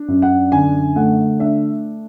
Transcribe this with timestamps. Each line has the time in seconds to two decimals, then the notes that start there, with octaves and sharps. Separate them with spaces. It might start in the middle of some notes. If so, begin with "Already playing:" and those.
Already playing: D4
0.08 F#2
0.22 F#5
0.52 D3 G#5
0.96 A3 F#5
1.39 D4 E5